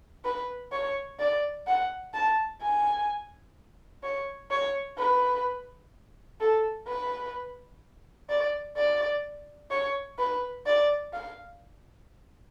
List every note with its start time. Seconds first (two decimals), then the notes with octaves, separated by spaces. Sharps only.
0.25 B4
0.72 C#5
1.19 D5
1.67 F#5
2.14 A5
2.61 G#5
4.03 C#5
4.51 C#5
4.98 B4
6.40 A4
6.87 B4
8.29 D5
8.76 D5
9.71 C#5
10.18 B4
10.66 D5
11.13 F5